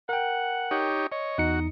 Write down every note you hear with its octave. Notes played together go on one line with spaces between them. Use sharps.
A#4 F#5 G5
D#4 G4 C#5
C#5 D#5
E2 D#4 F#4 C#7